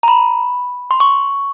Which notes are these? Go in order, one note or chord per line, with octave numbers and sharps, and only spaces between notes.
A#5
B5
C6
C#6